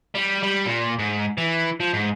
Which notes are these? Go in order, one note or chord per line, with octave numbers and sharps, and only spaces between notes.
G3
G3
A#2
G#2
E3
F3
G#2